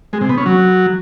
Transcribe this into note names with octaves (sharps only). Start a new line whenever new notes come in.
G#3
C3
B3
C#4
F#3